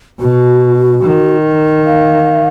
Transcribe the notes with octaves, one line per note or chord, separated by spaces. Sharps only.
B2 F#4
D#3
F5